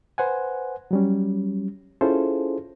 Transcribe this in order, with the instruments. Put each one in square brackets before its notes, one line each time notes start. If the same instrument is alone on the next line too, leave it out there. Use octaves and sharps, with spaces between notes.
[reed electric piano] B4 C5 F#5 G#5
F#3 G3 C#4
C#4 E4 F4 G#4 A4 C5